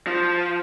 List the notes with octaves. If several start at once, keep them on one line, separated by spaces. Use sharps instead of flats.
F3